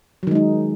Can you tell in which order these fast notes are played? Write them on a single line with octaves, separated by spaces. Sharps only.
F#3 D#3 G#3 D#4